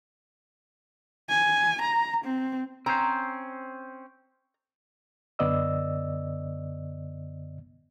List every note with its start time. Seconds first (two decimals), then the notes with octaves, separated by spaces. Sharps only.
1.29 G#5
1.82 A#5
2.25 C4
2.86 C4 C#4 C5 A#5
5.39 F#2 D3 B3 D5 D#5 E6